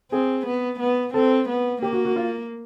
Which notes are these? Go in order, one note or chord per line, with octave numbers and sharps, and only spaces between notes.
C4 G#4
B3
B3
C4 A4
B3
A#3 G4
F#4
F#4
F4